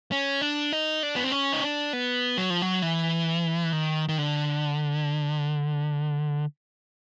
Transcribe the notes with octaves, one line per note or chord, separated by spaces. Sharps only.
C#4
D4
D#4
D4
B3
C4
C#4
D#4
D4
B3
F#3
F3
F#3
E3
D#3
D#3
D3